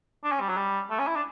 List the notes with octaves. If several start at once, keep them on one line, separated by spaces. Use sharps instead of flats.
D4
C#4
G3
F#3
G3
A3
C#4
E4
D4